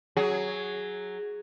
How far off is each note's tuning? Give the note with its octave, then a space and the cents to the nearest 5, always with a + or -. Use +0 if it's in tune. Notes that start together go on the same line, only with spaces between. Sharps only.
F#3 +5 G#4 +0